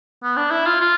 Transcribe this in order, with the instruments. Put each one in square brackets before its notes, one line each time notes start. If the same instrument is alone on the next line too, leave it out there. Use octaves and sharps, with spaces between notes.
[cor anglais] B3
D4
E4
F4
F4